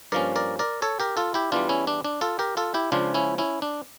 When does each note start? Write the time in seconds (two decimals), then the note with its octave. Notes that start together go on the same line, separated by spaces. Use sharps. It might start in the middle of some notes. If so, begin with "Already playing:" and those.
0.12 G2 F3 A#3 C#4 A#4 D5
0.36 A#4 D5
0.59 A#4 D5
0.82 A4 C#5
1.00 G4 A#4
1.17 F4 A4
1.34 E4 G4
1.52 E2 E3 G3 D4 F4
1.69 C#4 E4
1.87 D4
2.04 D4
2.21 F4 A4
2.39 G4 A#4
2.57 F4 A4
2.74 E4 G4
2.92 C#2 C#3 F3 D4 F4
3.14 C#4 E4
3.38 C#4 E4
3.62 D4